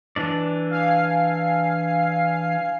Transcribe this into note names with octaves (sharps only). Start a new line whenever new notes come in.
E3 D4 D5
F5 G#5 C7